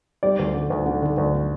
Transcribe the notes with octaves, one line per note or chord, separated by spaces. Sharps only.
G3 D5
D2
D3
D2
D3
D3
D2